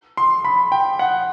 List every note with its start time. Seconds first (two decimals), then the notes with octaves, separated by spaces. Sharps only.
0.17 C6
0.44 B5
0.72 G5
0.99 F#5